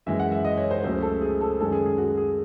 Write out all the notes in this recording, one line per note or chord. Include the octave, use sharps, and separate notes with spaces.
F#2 E3 G#3 E5
F#5
E5
D#5
C#5
C5
C#2 C#3 F#3 A3 C5
A4
G#4
A4
F#2 D#3 G#3 C#4 A4
G#4
G#4
F#4
G#4